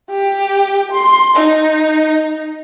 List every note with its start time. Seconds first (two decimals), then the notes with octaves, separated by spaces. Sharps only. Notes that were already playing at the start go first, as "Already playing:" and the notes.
0.11 G4
0.92 C6
1.36 D#4